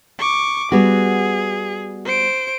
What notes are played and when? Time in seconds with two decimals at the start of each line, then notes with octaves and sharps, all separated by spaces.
0.19 C#6 D6
0.72 G3 B3 F#4 G#4
2.05 C5 D7